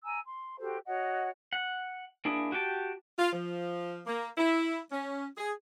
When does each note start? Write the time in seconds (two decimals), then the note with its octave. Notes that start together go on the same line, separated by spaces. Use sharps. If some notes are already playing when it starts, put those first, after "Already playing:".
0.04 G#5 A#5 E6
0.26 C6
0.59 F#4 G4 A4 C5
0.86 F#4 C#5 D#5 F#5
1.53 F#5
2.25 A#3 D4 E4 G#4
2.52 F#4 G4 G5 A5
3.18 F4
3.33 F3
4.07 A#3
4.38 E4
4.91 C#4
5.37 G#4